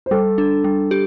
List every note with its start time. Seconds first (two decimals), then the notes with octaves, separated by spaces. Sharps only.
0.06 C5
0.11 G3 A4
0.38 D4
0.64 G3
0.91 G4